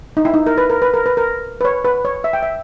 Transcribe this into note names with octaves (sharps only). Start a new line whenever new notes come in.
D#4
E4
D#4
A#4
B4
A#4
B4
A#4
B4
A#4
B4
C#5
B4
C#5
E5
G5
E5